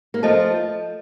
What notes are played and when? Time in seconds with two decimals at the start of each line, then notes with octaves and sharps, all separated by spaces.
0.14 A#3
0.23 F3 A3 A4 D#5 A5